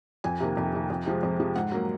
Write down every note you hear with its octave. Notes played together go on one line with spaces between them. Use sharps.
F2 G#5
C3 D#3 A#3
F2
C3 D#3 A#3
F2
C3 F3 G#3
F2
C3 F3 G#3
G#2 F#5
F#3 A#3